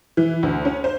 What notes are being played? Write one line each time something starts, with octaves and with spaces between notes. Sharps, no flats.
E3
D2
C#4
C5